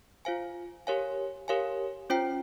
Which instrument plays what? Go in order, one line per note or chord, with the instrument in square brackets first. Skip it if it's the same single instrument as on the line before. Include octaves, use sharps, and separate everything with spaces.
[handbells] F4 C5 F5 G#5
G4 A#4 C#5 F5 G#5
G4 A#4 C#5 F5 G#5
C#4 F4 C5 G5